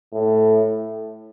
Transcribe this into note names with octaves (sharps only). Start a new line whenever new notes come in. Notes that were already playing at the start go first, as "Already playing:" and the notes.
A2